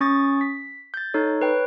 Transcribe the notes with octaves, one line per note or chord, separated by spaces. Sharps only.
C#4 C#6 D#6 A6
B6
G6 A6
D#4 A4 C#5
B4 C#5 G5